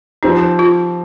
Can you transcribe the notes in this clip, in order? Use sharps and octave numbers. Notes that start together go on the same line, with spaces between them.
F3 C4 D#4 G4
F4